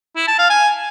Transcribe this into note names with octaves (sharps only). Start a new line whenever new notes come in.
E4
A5
F5
G#5